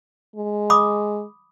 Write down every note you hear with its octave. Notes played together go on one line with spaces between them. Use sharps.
G#3
B5 D6 D#6